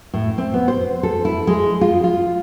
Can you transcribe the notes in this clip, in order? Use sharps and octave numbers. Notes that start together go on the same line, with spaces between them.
A2
C4
B3
C5
A4
E4
G#3
F4
F4